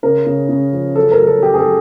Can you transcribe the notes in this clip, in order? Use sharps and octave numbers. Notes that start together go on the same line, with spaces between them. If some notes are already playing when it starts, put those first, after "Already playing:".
C#3 A#4
C#3
C#3
F3
F#3 A4
A#4
F#3
A4
F#3 G4
G#4
A4
F#3